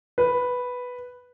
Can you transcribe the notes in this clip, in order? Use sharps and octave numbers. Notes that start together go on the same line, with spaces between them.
B4